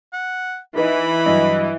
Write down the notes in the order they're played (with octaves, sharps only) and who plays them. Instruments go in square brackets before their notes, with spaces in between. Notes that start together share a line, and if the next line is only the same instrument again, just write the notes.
[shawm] F#5
[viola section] E3 [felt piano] D#4 B4 D#5 [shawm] B5
[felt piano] G2 F#3 [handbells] D#5